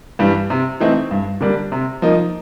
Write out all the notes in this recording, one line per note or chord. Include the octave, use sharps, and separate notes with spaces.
G2 E3 G3
C3
E3 A3 C4 D#4
G2
D3 G3 A#3 D4
C3
F3 A#3 D#4